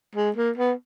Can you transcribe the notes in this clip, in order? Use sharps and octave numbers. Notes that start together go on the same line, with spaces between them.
G#3
A#3
B3